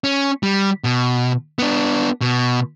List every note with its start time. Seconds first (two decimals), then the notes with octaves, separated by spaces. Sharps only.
0.04 C#4
0.43 G3
0.84 B2
1.59 B3 D4
2.21 B2